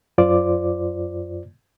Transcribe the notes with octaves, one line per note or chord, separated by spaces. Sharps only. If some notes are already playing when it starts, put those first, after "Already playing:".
F#2 F4 C5 D5 D6